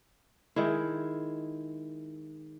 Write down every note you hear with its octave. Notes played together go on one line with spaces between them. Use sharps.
D#3 G#3 E4